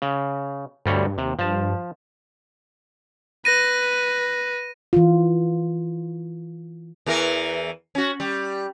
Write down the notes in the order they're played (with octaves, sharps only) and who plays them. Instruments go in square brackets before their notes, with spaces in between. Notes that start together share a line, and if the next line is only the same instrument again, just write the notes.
[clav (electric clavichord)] C#3
[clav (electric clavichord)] D2 G3 C#5 [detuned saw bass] G2
[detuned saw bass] D#2 [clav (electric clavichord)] C3
[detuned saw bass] G2 [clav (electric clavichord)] F3 A5
[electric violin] B4 [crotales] A#6 D#7
[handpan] E3 F4
[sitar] E2 E3 A#4
C#4 F#4
G3